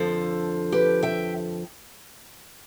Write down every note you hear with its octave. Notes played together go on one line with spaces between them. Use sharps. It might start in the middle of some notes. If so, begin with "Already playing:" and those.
Already playing: F2 D3 F3 A4 C5
G4 B4
E5 G5